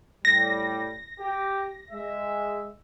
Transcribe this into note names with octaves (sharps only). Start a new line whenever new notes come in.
A2 G3 A#6
G4
G#3 E5